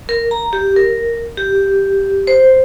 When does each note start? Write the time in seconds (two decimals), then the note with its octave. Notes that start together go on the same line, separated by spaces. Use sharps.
0.09 A#4
0.31 A#5
0.53 G4
0.76 A#4
1.37 G4
2.27 C5